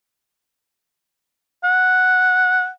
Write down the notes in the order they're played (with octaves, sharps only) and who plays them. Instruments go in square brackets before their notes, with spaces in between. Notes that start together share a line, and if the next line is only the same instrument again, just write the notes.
[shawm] F#5